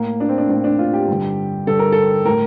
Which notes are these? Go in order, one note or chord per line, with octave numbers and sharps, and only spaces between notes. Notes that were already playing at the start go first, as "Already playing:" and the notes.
Already playing: A2 A#3
D4
C4
D4
A2 D4
D4
F4
G4
G2 D3
G2 D3 A4
A#4
A4
A2 A#4